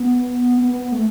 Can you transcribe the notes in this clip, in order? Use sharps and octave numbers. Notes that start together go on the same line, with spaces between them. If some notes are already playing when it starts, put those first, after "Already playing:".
Already playing: B3
B3
B3
B3
A3